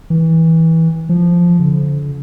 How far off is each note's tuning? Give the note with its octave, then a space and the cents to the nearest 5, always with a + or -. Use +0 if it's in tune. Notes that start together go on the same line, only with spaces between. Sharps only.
E3 -20
F3 -5
D3 -40